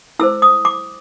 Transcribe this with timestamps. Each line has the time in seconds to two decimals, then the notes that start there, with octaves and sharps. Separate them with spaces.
0.19 E4 A4 C5 E6
0.42 D#6
0.65 D6